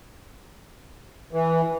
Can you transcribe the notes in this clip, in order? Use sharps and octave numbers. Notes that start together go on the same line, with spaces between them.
E3